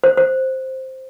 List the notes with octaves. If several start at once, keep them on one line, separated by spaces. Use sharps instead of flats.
C5
C5